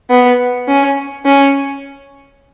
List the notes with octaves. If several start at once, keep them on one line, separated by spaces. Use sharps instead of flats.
B3
C#4
C#4